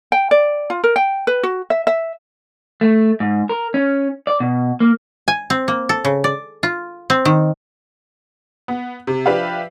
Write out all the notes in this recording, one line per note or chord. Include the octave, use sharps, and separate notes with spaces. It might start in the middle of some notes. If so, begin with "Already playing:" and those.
G5
D5
F4
A#4
G5
B4
F#4
E5
E5
A3
G#2
A#4
C#4
D5
B2
A#3
G#5
C4
A#3
A4
C#3
D5
F4
C4
D#3
B3
C3
F3 D4 G4 B4 E5 F5